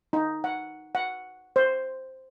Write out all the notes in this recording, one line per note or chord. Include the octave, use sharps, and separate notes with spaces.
D#4
F#5
F#5
C5